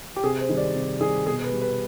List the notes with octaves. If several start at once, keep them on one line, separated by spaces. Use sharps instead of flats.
G4
C3 G#4
C5
D#3 G3
D5
C3
D#3 G3 G#4
B2 G#4
B4
G3
B4